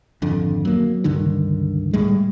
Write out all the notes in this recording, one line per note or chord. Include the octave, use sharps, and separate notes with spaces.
G#1 F2 D3
F#3 A#3
C#2 G2 D3 D#3
A2 G3 G#3